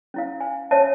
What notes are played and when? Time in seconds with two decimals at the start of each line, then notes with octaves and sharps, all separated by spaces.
0.14 C#4 E4 F5
0.41 G#5
0.71 C#4 C#5 E5 A5